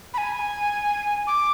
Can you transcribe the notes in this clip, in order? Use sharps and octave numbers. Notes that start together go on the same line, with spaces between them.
B5
G#5
D6